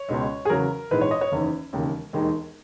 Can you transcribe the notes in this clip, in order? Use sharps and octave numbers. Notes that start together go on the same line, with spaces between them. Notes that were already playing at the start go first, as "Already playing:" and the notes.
Already playing: C#5
C#2 B2 G#3
G#4
E2 C#3 F#3 A#4
A#1 G#2 E3 G#3 B4
C#5
D#5
C#5
F#1 E2 D#3
E1 D#2 C#3
E1 D#2 D#3 G#3